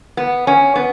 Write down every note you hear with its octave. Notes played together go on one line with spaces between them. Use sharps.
B3
C#4
B3